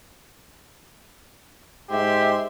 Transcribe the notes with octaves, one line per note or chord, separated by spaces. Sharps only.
G#2 G4 E5 C6